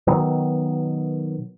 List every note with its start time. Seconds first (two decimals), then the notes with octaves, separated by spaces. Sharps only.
0.07 B2 D#3 F#3 B3